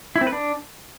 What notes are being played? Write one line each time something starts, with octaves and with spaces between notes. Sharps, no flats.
E4
C4
B4
D4